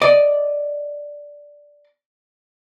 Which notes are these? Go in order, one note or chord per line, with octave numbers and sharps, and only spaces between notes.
D5 D#5